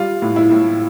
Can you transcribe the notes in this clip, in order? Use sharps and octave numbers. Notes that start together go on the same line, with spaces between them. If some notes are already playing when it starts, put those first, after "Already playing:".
Already playing: G3 F4
A2
E4
A2